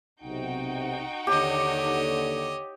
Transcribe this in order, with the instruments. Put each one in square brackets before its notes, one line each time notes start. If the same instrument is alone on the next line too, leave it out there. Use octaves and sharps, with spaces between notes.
[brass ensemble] B1 C3 [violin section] D#4 F#4 G5
[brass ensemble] D#2 D3 [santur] G4 [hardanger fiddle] C#5 D#5